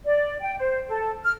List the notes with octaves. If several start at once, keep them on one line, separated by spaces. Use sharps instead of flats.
D5
G5
C5
A4
F6